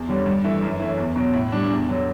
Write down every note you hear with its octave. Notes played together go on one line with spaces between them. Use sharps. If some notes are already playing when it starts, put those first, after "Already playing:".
Already playing: E2
D3 G3 C#4
G2
E3 A3
F#2
E3 A3 C#4
E2
B2 F#3
A2
G3 D4
E2
D3 F#3